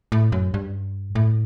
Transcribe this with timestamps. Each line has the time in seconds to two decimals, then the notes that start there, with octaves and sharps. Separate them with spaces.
0.12 A2
0.32 F#2
0.54 G2
1.15 A2